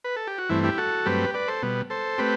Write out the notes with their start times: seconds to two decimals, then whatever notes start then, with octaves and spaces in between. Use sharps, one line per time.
0.04 B4
0.16 A4
0.27 G4
0.38 F#4
0.50 G2 E3 A3 C4 E4
0.63 E4 G4
0.78 F#4 A4
1.06 G2 F#3 A3 C4 G4 B4
1.34 B4 D5
1.48 A4 C5
1.62 B2 G3 B3
1.90 A4 C5
2.18 A3 C4 G4 B4